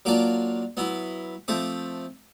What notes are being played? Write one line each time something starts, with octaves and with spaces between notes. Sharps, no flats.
F#3 A#3 D4 F4 D6
F#3 B3 E4
F3 A3 C4 D6